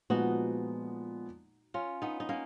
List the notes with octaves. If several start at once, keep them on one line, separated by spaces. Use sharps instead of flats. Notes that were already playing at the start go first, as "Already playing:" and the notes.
A#2 F3 G#3 B3 D#4 F#4
C#4 F4
B3 D#4
D#4
A#3 C#4